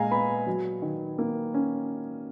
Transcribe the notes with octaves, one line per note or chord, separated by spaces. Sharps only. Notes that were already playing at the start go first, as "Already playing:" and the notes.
Already playing: A#2 G#3 F5 G#5 A#5
B3 B5
F#3
D#3
A#3
C#4